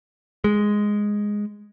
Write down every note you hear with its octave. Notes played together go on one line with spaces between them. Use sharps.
G#3